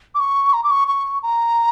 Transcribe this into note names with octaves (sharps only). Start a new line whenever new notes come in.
D6
C#6
A#5
D6
C#6
C#6
A#5